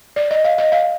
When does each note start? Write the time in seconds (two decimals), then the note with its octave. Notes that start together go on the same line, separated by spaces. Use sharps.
0.16 D5
0.31 D#5
0.44 F5
0.58 D#5
0.72 F5